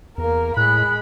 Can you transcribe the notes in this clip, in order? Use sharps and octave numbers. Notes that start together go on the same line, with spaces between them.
E2 A#3 A#4
A2 G#3 B5 F#6